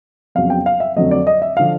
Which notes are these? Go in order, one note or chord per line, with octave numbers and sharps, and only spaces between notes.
F2 C#3 F#3 B3 F5
G5
F5
E5
F2 D3 F#3 A3 C4 D#5
D5
D#5
E5
D3 F3 F5